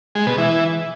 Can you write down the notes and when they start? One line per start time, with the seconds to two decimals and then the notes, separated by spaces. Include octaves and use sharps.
0.15 G#3
0.27 B2
0.38 E3